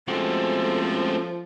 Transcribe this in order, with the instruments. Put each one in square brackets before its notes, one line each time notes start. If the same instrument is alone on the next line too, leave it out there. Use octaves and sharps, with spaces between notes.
[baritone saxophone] F3 [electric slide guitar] G#3 A3 F#4 [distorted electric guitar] C4 C#4 [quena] A4